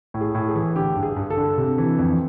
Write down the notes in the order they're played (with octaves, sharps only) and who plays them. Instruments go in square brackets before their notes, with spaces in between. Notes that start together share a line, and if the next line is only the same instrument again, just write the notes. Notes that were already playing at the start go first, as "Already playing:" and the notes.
[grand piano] A2
G#4
A2
G#4
E3
D3 G4
G2
G#4
G2
A4
D3
C3
E3
F2